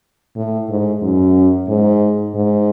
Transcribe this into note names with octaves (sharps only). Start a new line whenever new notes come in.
A2
G#2
F#2
G#2
G#2